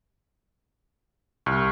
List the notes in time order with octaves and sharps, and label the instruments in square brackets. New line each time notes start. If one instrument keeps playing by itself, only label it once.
[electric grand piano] C2 [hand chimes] C#6 F6